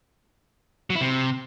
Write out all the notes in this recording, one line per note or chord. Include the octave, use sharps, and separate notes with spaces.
F#3
E4
C3